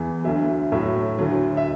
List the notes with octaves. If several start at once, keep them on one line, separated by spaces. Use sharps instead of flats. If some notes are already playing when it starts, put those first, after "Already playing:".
Already playing: E2 E3
D2 D3 F#3 E5
A2 F#3 E5
D2 D3 F#3
E5